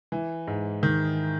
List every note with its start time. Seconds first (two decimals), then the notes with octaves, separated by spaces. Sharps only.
0.12 E3
0.47 G#2
0.83 D#3